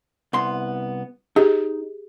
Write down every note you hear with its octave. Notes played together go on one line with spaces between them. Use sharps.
C2 B3 C6
D#4 G4 G#4 D#5